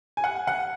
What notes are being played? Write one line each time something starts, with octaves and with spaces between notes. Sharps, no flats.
G#5
F#5
F#5